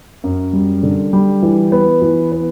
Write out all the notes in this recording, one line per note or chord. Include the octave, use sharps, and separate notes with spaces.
F#2
G3
D3
G3
E3
B3
E3
B3